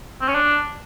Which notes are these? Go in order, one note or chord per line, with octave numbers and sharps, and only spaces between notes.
C4
C#4
D4